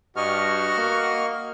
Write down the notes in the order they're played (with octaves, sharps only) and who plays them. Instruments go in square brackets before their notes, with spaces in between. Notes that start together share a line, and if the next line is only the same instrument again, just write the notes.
[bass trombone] G2 [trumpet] F#4 [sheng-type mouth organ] D#5 C#6 F6
[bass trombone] A#3